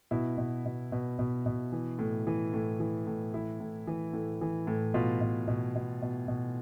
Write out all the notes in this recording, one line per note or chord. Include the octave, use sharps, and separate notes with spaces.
B2 E4
B2
B2
B2
B2
B2
E3
A2
E3
A2
E3
A2
E3 E4
A2
E3
A2
E3
A2
B2 F4
B2
B2
B2
B2
B2